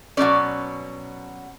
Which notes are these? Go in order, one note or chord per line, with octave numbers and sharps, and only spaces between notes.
B2 F#3 A3 C#4 D5